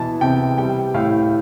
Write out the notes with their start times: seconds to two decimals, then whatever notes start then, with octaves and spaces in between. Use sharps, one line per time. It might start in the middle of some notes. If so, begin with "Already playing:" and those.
Already playing: B2 E3 A5
0.21 C3 G5
0.58 G3 G5
0.94 A2 F5